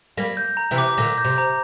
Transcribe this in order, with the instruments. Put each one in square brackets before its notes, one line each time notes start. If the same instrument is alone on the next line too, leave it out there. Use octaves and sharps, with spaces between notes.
[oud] G3 A#3 [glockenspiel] A#6
[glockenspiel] G6
A#5
[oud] C3 E3
[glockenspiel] D6
[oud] A#2 D3 [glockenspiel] A#6
[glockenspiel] G6
[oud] C3
[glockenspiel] A#5